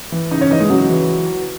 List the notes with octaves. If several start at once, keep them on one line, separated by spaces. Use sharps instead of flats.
E3
C#3 D#4 D#5
C#4 C#5
E3 D#4 D#5
G#3 G#4
C#3 F#3 F#4
E3